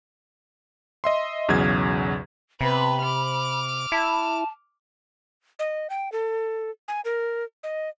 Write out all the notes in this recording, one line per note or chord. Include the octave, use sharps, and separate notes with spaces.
D#5 E5 C6
B1 E2 C#3 F#3 G#6
C3 B3 B4 B5
D6 F6
E4 A5
D#5
G5
A4
G#5
A#4
D#5